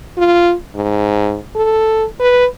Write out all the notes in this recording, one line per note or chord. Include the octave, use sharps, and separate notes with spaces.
F4
G#2
A4
B4